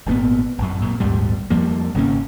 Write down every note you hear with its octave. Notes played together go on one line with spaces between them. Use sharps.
G#1 G2 A#2 B3
A1 F#2
F#2 A#2
A#1 D#2 G#2 G3
F2 F3 G3 A#3
G#1 C#3 A#3 C#4